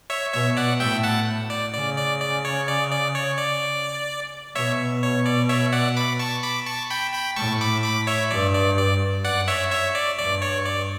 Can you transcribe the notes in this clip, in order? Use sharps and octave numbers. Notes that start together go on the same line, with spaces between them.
C#5 E5
B2 C#5 E5
D5 F#5
A2 E5 G5
F#5 A5
D5
C#3 D5
D5
D5
C#5
D5
D5
C#5
D5
B2 C#5 E5
C#5
D5
C#5 E5
D5 F#5
B5 D6
A5 C#6
B5 D6
A5 C#6
G5 B5
G5 B5
A2 A5 C#6
B5 D6
B5 D6
C#5 E5
G2 D5
D5
D5
F#2 D5 F#5
C#5 E5
C#5 E5
D5
G2 D5
C#5
D5